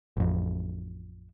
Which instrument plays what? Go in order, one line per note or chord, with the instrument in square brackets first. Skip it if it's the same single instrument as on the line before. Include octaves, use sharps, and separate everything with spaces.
[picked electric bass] A1 F2